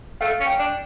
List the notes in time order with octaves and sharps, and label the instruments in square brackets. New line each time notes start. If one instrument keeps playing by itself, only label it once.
[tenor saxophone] A3 [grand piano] F5
[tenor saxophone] C#4
[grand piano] G5
[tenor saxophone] D4